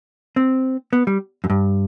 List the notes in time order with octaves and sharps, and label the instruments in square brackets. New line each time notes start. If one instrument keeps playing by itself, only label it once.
[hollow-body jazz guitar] C4
B3
G3
F#2
G2